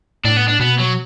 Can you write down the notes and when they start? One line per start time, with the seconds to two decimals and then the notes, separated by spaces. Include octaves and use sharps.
0.25 A2 D4
0.36 B3
0.48 D4
0.60 B2 B3
0.79 F#3